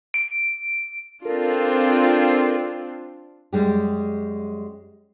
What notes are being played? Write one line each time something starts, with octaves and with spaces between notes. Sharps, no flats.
D7
C4 D4 F4 A4 A#4
F#2 G3 G#3 G4